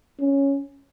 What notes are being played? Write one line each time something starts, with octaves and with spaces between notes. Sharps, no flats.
C#4